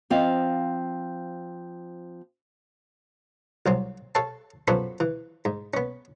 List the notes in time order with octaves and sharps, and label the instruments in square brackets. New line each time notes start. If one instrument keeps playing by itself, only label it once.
[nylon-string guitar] F3 C4 D#5 F5
[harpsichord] C2 F#3 C4
A4 C#5 F5 A5
F#2 B3 F4 F#4 A4 C5
E3
G#2
B3 C#4